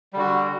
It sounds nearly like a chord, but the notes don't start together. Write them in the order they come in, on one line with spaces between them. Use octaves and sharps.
G3 D3 F#4